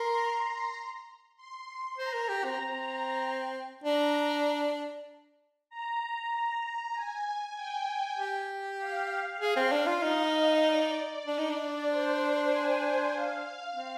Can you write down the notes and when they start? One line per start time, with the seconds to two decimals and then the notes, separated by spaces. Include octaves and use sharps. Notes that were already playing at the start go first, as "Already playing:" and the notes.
Already playing: A#4 C6
0.12 A#5
1.36 C6
1.98 C5 A#5
2.13 A#4
2.29 G4
2.44 C4
2.60 C4 A#5
3.84 D4 A#5
5.70 A#5
6.93 G#5
7.55 G5
8.17 G4
8.79 F5
9.40 G#4 F5
9.56 C4
9.72 D4
9.87 F4
10.02 D#4 D#5
10.65 D5
11.27 D4
11.39 D#4
11.50 D4
11.88 C5
12.50 G#5
13.13 F5
13.74 C4